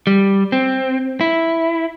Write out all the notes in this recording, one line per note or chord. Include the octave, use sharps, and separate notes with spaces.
G3
C4
E4